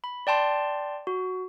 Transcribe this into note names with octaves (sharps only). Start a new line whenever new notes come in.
B5
D5 G5 A5 C6
F#4